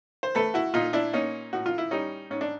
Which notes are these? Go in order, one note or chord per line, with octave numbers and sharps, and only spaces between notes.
C5
A3 A4 B4
E4 F#4
A#2 D#4 F4
D4 E4
A#3 C#4 D#4
A2 F#4
F4
E4
G3 C#4 D#4
G#2 C#4
D4